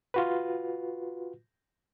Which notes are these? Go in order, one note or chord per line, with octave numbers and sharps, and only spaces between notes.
F4 F#4 B4